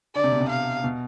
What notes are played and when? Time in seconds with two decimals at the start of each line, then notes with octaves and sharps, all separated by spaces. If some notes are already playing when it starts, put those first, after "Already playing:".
0.15 D3 D5
0.24 C3
0.32 B2
0.40 C3
0.49 F5
0.84 B2